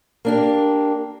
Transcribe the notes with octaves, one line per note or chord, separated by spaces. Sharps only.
A#3 D4 G4